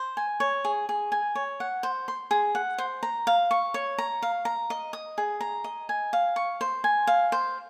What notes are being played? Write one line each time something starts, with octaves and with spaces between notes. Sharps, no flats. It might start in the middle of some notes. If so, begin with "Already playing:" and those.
Already playing: C5
G#5
C#5
G#4
G#4
G#5
C#5
F#5
C5
C6
G#4
F#5
C5
A#5
F5
C#6
C#5
A#5
F5
A#5
D#5
D#6
G#4
A#5
D#5
G#5
F5
C#6
C5
G#5
F5
C5